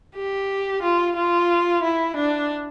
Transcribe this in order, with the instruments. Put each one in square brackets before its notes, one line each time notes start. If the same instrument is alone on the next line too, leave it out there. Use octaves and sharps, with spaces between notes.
[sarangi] G4
F4
F4
E4
D4